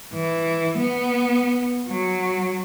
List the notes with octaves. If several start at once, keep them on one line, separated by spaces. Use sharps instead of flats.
E3
B3
F#3